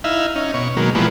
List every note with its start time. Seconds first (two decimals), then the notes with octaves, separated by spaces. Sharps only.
0.04 D#4 E4 E5 F5
0.36 C#4 D#4
0.54 B2 C#5
0.77 B2 D#3 F#3 G#3 A#3
0.95 A#2 E3 F3 G3 G#3 B3